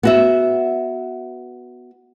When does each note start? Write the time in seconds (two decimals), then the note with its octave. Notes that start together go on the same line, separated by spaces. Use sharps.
0.03 B3 F#4 E5